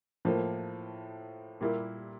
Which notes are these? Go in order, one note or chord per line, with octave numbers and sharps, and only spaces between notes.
A2 F3 A#3
A#2 G3 A#3 E4 G4